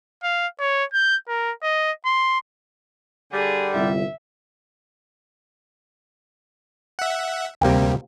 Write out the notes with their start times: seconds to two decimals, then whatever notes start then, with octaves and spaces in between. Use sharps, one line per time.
0.23 F5
0.60 C#5
0.93 G6
1.28 A#4
1.63 D#5
2.05 C6
3.33 D3 G3 G#4
3.75 G1 C2 E5
6.99 E5 F#5
7.61 D2 C3 G3 A#3 G5